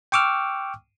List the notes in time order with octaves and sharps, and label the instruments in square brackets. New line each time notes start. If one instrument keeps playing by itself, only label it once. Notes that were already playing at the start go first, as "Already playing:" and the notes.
[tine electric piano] G5 C#6 D6 E6 F6